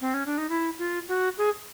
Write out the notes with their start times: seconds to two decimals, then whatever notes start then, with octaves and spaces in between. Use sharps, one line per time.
0.01 C4
0.14 C#4
0.26 D4
0.38 D#4
0.49 E4
0.79 F4
1.08 F#4
1.38 G#4